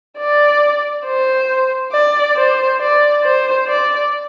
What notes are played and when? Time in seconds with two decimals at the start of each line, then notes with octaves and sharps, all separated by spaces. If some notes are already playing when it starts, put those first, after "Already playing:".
0.18 D5
1.05 C5
1.92 D5
2.36 C5
2.80 D5
3.23 C5
3.67 D5